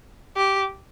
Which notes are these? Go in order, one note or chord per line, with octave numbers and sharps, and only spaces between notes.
G4